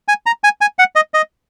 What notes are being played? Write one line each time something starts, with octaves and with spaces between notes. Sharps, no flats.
G#5
A#5
G#5
G#5
F#5
D#5
D#5